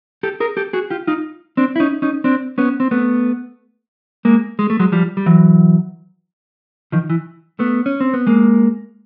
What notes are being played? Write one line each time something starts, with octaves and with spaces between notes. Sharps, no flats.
G4 A4
G#4 A#4
G4 A4
F#4 G#4
F4 G4
D#4 F4
C4 D4
E4
C#4 D#4
C#4 D#4
C4 D4
B3 C#4
C4
A3 B3
G#3 A#3
G#3
A3
F#3 G#3
F3 G3
G3
E3 F#3
D#3 F3
E3
A3 B3
C#4
C4
B3
G#3 A#3